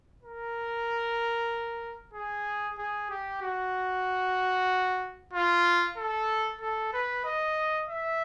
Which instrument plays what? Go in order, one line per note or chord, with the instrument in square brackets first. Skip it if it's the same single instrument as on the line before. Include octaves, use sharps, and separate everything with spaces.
[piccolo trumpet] A#4
G#4
G#4
G4
F#4
F4
A4
A4
B4
D#5
E5